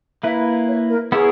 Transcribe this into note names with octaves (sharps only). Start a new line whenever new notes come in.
A#3 E4 B4 E5
C#5
A#4
B3 E4 G#4 A#4 C#5